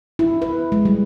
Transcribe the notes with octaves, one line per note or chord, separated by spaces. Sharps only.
E4
B4
G#3
G3